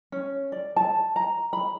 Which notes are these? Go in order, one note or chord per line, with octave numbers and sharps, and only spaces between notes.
C#4
D5
A5
A#5
B5